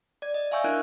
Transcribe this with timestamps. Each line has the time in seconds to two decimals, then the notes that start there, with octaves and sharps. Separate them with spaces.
0.22 D5 G#6
0.34 D#5
0.51 E5 F5 G#5 C#6 E6 G6
0.64 D4 E4 A#4 F6 F#6 G#6